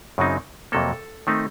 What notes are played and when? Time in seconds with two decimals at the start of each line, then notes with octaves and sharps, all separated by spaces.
0.18 F#2 C#3 F#3 C4 D#4
0.72 F2 C3 F#3 A#3 A4
1.27 D#3 A3 C4 D#4